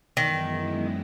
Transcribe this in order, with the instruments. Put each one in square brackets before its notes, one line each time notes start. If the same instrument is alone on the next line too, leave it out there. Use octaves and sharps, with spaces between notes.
[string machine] F#2 E3 G#3 B3 E4 [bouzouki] D#3